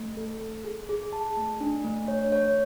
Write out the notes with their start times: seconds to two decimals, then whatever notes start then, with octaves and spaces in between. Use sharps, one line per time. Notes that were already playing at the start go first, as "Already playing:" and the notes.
Already playing: A3
0.17 A4
0.41 A4
0.64 G#4
0.89 G#4
1.13 A5
1.37 A3
1.61 D4
1.84 A3
2.08 C#5
2.32 C#5